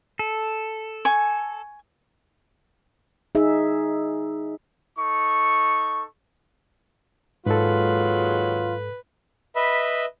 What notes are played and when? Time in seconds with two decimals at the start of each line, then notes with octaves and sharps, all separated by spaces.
0.19 A4
1.05 G#5 C#6
3.35 D#4 G#4 E5
4.98 D#4 A4 C#6
7.46 D#2 G#2 F#3 G#3 F4 A4 B4
9.56 B4 D#5 E5 B5